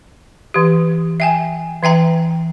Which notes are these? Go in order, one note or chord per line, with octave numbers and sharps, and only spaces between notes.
E3 G4
E5 G5 G#5
E3 E5 G5 A#5